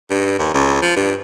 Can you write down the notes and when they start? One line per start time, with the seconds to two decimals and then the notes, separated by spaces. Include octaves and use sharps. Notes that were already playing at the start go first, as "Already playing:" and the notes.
0.10 G2
0.39 D#2
0.54 C#2
0.82 F3
0.96 G2